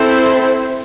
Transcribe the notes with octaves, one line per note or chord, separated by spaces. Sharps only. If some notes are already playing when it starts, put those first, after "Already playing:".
Already playing: C4 E4 A4 C5